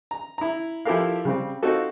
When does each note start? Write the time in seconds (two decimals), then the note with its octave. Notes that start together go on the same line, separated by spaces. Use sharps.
0.11 A#5
0.38 E4 A#5
0.85 F3 E4 G4 A4 A#4 F5
1.25 C#3 G3 C4
1.63 C4 D#4 F4 F#4 A4